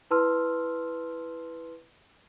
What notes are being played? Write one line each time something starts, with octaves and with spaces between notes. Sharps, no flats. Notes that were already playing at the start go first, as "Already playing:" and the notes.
E4 B4 A5 C6 E6 F6